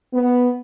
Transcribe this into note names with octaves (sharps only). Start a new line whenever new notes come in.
B3